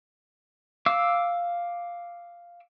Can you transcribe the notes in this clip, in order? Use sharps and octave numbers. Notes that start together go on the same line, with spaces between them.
F5 D6 E6